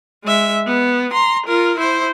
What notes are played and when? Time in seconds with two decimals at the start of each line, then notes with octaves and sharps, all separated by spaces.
0.25 G#3 E5
0.67 B3
1.12 A#5 C6
1.46 F4 A#4
1.77 E4 C5